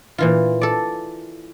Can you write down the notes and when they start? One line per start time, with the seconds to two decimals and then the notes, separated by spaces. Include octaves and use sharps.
0.18 A#2 E3 F4
0.61 A4 D5